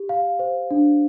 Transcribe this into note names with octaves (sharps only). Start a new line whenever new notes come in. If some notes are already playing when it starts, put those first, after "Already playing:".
Already playing: G4
F5
C5
D4